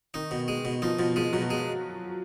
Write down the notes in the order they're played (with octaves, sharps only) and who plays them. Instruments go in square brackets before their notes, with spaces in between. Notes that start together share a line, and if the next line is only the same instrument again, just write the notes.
[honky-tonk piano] D#3 [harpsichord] D#4
[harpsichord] B2
G#3
B2
[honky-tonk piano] F3 [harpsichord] D#4
[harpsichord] B2 [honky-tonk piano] F3
[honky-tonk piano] F3 [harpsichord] G#3
[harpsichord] B2 [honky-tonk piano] F#3
[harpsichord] G#3